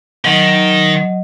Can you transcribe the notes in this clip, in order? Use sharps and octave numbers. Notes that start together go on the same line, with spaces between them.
D#3 F#3 D#5